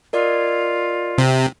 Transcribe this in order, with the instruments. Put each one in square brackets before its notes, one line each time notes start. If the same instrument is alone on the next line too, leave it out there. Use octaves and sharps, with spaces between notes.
[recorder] F4 [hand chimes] A#4 D5 D#5
[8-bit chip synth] C3